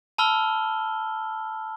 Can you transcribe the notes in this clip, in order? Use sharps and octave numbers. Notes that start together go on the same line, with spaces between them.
A5 B5 E6 F6 G7